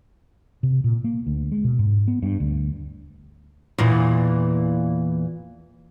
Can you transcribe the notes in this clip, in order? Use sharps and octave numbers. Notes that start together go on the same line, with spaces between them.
C3
A#2
A#3
D2
G#3
B2
G#2
B3
G2
D2
E2 A#2 E3